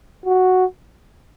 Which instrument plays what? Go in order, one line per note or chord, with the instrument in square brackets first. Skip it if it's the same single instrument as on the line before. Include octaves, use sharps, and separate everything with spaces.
[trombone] F#4